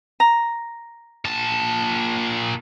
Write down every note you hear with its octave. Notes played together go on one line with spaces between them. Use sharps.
A#5
A#2 A5